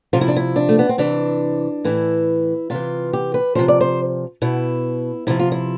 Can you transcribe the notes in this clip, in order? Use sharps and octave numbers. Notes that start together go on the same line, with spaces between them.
C3 F3 F4
E4
D4
E4
D4
A3
B3
C4
C3 E3 D4
A2 E3 E4
C3 E3 F4
G4
B4
C3 F3 C5
D5
C5
B2 E4
C3 F3 E4
F4
E4